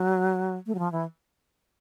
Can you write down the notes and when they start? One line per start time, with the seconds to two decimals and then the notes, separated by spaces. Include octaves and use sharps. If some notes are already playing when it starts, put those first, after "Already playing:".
Already playing: F#3
0.66 A3
0.75 F#3
0.79 F3
0.92 E3